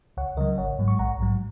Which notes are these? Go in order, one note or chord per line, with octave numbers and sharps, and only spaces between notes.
C#2 C#5 F#5
C#3 F#3 A#4 D#5
G#1 C#5 F#5
G#2 F#3
C#6
A#1 F#5 A#5
G#2 F#3